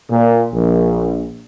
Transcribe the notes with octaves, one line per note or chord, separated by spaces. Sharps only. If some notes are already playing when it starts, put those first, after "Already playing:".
A#2
A#1